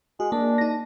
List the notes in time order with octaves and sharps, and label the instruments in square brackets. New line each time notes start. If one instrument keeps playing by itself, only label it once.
[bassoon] G#3 [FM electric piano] F#4
[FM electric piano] A#3 [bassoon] D4
[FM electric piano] D#4 A#6